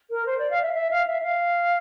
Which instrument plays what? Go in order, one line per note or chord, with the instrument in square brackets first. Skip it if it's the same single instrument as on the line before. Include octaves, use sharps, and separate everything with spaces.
[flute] A#4
C5
D5
F5
E5
E5
F5
E5
F5